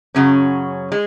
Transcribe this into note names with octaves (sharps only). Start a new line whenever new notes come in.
F#2 C#3 F#3 C#4
G#3